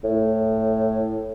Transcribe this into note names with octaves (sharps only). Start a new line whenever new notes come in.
A2